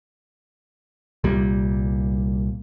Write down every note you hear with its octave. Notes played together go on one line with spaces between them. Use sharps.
C2 A#2 G3